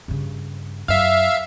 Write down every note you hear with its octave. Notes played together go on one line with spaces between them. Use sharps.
G2 C#3
F#2 E5 F5